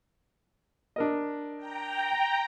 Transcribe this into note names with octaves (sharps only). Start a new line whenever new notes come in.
D4 A#4 D#5
G5 A#5